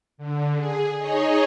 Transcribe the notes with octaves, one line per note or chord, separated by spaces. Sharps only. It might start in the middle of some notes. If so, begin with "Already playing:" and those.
D3
G#4
D#4 G#4 C#5 D#5